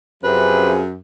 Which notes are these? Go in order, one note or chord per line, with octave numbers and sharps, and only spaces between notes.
F#2 C3 F3 G#4 B4